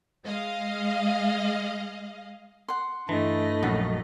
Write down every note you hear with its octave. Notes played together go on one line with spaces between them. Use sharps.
G#3 D#5 F5
F#5 C6
G2 E3 A3 D4 E4 D#5
A#1 F#2 D#4 F#5